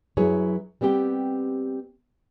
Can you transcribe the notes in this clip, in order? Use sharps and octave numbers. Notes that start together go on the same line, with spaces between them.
F#2 F#3 E4 G#4 B4 C#5
G3 B3 C4 G4 G5